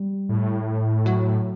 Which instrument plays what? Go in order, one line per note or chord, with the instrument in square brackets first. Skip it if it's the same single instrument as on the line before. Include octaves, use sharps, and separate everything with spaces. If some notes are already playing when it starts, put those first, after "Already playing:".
Already playing: [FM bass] G3
[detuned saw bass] A2
[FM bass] F#3